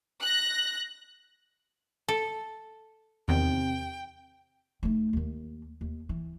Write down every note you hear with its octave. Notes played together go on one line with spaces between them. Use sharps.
F#6 A#6
A4
E2 C3 D#3 G5
A3 D#4
D#2 D#3
D#2
E3